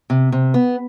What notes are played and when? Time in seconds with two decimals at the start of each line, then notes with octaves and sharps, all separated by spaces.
0.10 C3
0.32 C3
0.54 B3